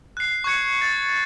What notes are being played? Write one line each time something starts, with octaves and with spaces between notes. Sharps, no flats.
F#6 C7
C#6 F#6 G#6 C#7
A6